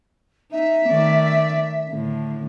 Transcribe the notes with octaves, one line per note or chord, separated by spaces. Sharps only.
D#4 E5
D#3 A3 D5
A2 D3